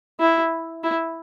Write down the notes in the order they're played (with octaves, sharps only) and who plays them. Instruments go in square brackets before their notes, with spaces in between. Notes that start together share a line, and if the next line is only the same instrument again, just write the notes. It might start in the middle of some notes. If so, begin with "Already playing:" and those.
[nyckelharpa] E4
E4